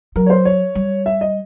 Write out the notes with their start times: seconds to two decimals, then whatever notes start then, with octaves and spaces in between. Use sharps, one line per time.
0.16 F#3 A#4
0.26 C#5
0.30 C5
0.45 C#5
0.75 G3
1.06 E5
1.21 D#5